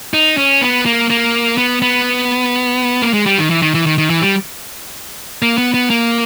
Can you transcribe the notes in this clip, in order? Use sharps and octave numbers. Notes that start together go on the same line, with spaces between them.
D#4
C#4
B3
A#3
A#3
B3
B3
A#3
G#3
G3
D#3
E3
D#3
E3
D#3
D#3
E3
G3
A#3
B3
B3
A#3